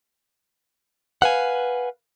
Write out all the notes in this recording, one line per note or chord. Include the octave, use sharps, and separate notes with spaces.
B4 F5 F#5 G#5